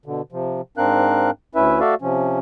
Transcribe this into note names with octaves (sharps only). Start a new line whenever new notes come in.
B2 D3
C3 F3
G#2 C4 D4 A#4 F5 F#6
D2 C#4 E4 B4 E5
A3 F#4 A4 D5 E5 F5
C3 F3 C#4